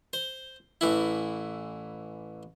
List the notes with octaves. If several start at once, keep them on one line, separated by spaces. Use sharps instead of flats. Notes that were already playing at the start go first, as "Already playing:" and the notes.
C5
A1 E3 E4